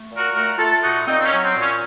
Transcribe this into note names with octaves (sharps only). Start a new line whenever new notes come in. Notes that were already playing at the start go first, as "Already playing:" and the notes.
Already playing: A3
A#2
F#4 A#4
A3 F#4 A#4
A3 F4 A4
A#2 D#4 F#4
A#2 C4 D#4
C4
C#4
F#3
C4
A#2
C#4